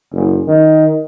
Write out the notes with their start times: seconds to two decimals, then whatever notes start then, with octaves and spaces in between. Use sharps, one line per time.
0.12 F#1
0.47 D#3